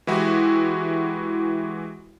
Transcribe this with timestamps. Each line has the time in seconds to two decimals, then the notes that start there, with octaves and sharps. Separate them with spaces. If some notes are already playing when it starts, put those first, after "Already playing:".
0.07 E3 G#3 E4 F#4 G4